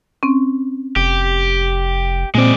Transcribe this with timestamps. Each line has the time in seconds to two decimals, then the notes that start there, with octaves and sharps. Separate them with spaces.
0.23 C4 C#4
0.96 F1 G4
2.35 A#2 G#3 C4 D5